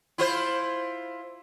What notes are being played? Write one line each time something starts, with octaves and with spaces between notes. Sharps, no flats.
E4 F4 C5